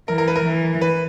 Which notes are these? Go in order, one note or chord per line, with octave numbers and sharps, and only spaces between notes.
E3 A#4
A#4
B4
A#4
E3
B4